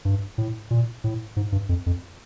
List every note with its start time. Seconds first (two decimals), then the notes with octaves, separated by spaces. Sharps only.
0.05 G2
0.38 A2
0.71 A#2
1.04 A2
1.36 G#2
1.52 G2
1.69 F2
1.86 F2